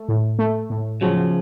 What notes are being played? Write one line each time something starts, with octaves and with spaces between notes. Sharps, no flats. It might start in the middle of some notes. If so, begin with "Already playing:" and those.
Already playing: A3
A2
A3
A2
C#3 F3 F#3